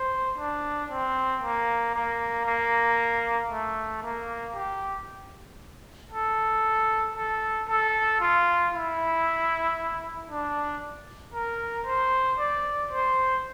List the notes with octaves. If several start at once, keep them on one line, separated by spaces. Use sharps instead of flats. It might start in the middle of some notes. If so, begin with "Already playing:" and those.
Already playing: C5
D4
C4
A#3
A#3
A#3
A3
A#3
G4
A4
A4
A4
F4
E4
D4
A#4
C5
D5
C5